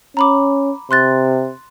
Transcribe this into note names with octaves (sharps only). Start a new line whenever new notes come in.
C#4 A#5 B5 D6
C3 C6 F#6 A6